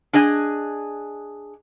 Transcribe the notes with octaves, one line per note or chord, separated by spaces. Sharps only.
D4 G#4 D#5 G#5